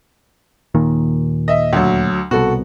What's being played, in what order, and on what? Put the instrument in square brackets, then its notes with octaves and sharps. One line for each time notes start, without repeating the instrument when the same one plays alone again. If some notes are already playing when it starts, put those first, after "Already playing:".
[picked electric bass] D#2 A#2 D#3
[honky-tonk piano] D#5 E5
D2 F#3
[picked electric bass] C2 B2 [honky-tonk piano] F#4 A4